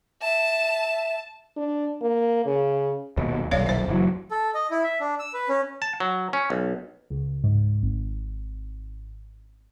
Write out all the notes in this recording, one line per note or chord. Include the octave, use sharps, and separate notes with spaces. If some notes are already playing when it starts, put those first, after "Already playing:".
E5 A5 E7
D4
A#3
C#3
D#1 D#2 B2
D#1 B1 C#5 D5 F5
C5 E5
F#1 E3 F#3
A4
D#5
E4
E5
D4
E6
B4
C#4
A5
F#3
C#4
B1
C#2
G#2
G#1